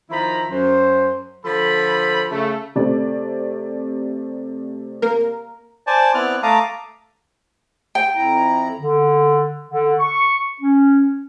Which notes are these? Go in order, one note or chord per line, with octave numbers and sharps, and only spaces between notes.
D#3 F3 E4 A#5 B5
F#2 C5
D3 F3 A4 B5
C#3 A3
C3 A3 D5
A#3 A#4
C5 D5 G#5 A5
B3 C4 E4 D5 F6 F#6
A3 F5 A5 A#5 D6 D#6
G5
F2 E4 A#5
D3
D3
C#6
C#4